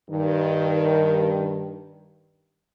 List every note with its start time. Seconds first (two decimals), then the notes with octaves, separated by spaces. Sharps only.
0.10 G2 D#3